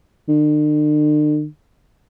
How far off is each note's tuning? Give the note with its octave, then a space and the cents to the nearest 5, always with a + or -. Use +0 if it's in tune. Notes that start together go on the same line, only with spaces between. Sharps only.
D3 +45